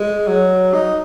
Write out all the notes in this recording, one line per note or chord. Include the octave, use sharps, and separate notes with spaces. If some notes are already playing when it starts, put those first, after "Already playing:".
Already playing: G#3
F#3
D#4